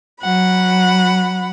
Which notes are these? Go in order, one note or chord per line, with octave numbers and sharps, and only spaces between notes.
F#3 F#5 B5